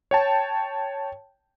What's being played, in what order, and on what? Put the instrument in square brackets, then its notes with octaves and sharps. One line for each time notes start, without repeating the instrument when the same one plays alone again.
[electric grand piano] C#5 G5 A5